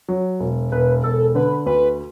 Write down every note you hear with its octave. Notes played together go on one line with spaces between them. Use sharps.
F#3
E1
E1 B4
E1 A4
D3 B4
D2 B4